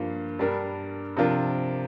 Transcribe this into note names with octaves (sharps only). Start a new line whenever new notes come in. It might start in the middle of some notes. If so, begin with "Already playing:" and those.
Already playing: G2 F3 A#3 F4
G2 G3 D4 A#4
C3 F3 D4 F4 A#4